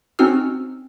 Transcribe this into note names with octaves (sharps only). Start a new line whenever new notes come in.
C4 C#4 D#4 F#4 E6 F6